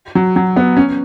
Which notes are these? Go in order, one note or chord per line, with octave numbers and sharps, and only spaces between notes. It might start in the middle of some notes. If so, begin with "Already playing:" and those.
F#3
F#3
B3
C#4